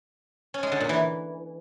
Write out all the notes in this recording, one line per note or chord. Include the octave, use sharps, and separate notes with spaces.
C#4
G#3
D3
A#2
E3